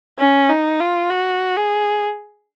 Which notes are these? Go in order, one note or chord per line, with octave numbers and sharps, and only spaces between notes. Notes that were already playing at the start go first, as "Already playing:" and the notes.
C#4
D#4
F4
F#4
G#4